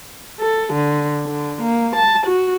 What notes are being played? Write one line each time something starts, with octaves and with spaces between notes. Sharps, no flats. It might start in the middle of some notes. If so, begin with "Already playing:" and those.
A4
D3
D3
A#3
A5
F#4